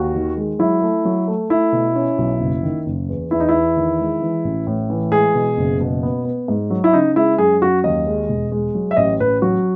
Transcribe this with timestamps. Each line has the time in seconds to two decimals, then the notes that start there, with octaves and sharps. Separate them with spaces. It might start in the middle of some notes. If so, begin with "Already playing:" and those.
Already playing: D#2 F#4
0.14 D#3
0.37 G#3
0.59 F#3 E4
0.82 A3
1.05 F#3
1.28 A3
1.50 A3 E4
1.73 B2
1.96 C#4
2.18 B1
2.40 F#1
2.63 D#3
2.86 F#1
3.09 E2
3.31 E2 E4
3.40 D#4
3.49 E2 E4
3.77 D#3
3.99 G#3
4.22 E3
4.45 A1
4.67 A2
4.90 E3
5.12 G#3 G#4
5.35 B2
5.57 F#1
5.81 B2
6.03 B3
6.25 B3
6.48 G#2
6.70 F#3
6.84 E4
6.93 C#3 D#4
7.16 G#3 E4
7.38 F#2 G#4
7.61 F#2 F#4
7.84 D#2 D#5
8.07 G#3
8.29 E1
8.52 G#3
8.75 F#3
8.91 E5
8.97 A1 D#5
9.20 A1 B4
9.42 F#3 F#4